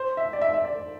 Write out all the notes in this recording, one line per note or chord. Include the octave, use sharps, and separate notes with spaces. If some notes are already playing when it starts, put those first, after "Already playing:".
Already playing: C5
E5
D5
E5
E5
D5